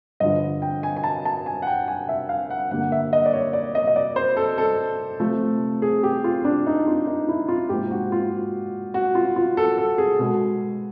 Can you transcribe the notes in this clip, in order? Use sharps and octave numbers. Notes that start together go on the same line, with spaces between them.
G2 D3 F3 D#5
G5
G#5
G#5
A5
A5
G#5
F#5
G5
G#5
E5
F5
F#5
G2 D3 G3 A#3 F#5
E5
D#5
D5
C#5
D5
D#5
D#5
D5
C5
A4
A4
C3 F3 A3
G#4
G4
F4
D4
D#4
F4
D#4
E4
F4
G#2 F3 A#3 G4
F#4
F4
F#4
F4
F4
A4
A4
G#4
B2 G#3